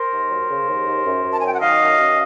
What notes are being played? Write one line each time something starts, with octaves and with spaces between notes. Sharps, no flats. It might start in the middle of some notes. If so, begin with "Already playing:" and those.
Already playing: A#4 C5
D#2
F#3
C#3
D#2
D#2
F#2
F#2
A5
G#5
F#3 G5
F#5
D#3 D#5 F5
F#2
F#2